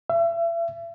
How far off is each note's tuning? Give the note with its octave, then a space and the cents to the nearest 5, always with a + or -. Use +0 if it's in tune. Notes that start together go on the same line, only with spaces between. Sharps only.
E5 +35